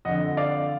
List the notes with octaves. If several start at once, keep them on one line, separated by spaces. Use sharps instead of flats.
F2 D3 D#5 F#5
D5 F5